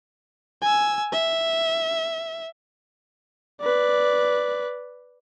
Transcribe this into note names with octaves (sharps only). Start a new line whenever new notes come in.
G#5 E6
E5
B4 D5